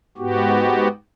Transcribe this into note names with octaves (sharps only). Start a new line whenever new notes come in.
G#2 B3 F#4 G4